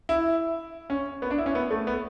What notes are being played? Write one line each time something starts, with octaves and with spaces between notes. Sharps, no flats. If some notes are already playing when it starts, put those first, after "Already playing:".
E4
C#4
B3
D4
E4
C#4
B3
A3
B3